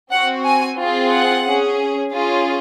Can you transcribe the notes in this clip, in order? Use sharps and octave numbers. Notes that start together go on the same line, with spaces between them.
C4 F#4 F#5
G#5
C4 F4 G#4
F#5
C#4 G#4
C#4 F4 G#4